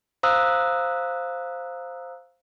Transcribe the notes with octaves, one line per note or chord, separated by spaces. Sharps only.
C5 F5 A#5 D#6 E6 F#6